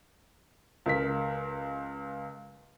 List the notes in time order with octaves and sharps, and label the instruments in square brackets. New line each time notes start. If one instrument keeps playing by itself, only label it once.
[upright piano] C#2 A#4 B6